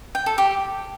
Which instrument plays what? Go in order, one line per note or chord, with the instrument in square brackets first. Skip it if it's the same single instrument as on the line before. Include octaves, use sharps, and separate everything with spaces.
[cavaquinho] G5
A4
G4